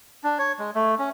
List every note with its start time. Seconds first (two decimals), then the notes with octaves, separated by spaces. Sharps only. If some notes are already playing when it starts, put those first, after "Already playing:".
0.24 D4
0.39 C#5
0.59 G#3
0.75 A3
0.99 C#4